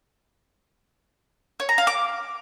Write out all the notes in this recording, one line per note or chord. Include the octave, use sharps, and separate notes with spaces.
C#5
A#5
F5
D6